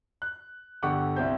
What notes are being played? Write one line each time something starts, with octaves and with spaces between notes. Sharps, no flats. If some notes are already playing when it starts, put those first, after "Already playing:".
F#6
G1 D3 G4 F#5 C#6 D6
C2 E4 G4 C5 G6